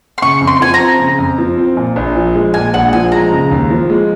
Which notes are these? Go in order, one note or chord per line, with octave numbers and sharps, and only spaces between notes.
C6
C#3 C#6
F2
C6
F3 G#5
A#5
C4
C#3
F2
F3
C4
A#2
A#1
F3
G#3
A#2 G#5
A#1 F#5
F3 G#5
G#3 A#5
C#3
D#2
F3
G#3